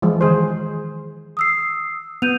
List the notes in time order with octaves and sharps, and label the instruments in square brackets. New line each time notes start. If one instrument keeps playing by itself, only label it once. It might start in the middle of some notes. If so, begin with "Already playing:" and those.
[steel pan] E3 F3 G#3
D#3 G#4 C5
[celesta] D#6 E6 C7
[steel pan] B3 [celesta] G6 D#7 F7